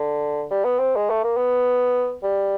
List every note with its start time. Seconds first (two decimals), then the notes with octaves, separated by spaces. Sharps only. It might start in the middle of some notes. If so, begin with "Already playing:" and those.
Already playing: D3
0.51 G3
0.65 B3
0.79 C4
0.96 G#3
1.10 A3
1.24 A#3
1.37 B3
2.23 G3